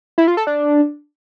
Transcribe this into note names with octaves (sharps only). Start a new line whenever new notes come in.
E4
F4
A4
D4